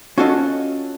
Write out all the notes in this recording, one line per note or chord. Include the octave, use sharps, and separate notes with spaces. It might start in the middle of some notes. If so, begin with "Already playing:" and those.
C#4 F4 F#4 A4 C#5 D#5